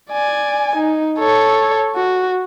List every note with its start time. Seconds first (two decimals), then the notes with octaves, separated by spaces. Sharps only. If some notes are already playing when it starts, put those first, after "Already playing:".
0.12 D5 G#5
0.76 D#4
1.19 A4 C#5
1.96 F#4